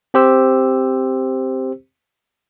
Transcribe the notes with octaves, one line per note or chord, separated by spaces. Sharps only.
C4 G4 C5 E6